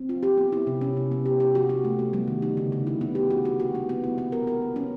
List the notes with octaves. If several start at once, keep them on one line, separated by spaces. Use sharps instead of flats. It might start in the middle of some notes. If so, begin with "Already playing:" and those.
Already playing: C4
F4
G4
B3
E4
C3
C#4
C3
B3
G4
G4
F#4
F#4
A3
B3
G3
D#3
D#4
C#3
C#3
E4
B3
G4
F#4
F#4
F#4
B3
B3
E4
B3
A#4
A#4
E4
C#4